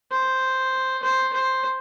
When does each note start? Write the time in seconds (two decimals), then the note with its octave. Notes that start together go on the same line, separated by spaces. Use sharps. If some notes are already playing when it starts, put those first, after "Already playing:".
0.11 C5
1.03 C5
1.33 C5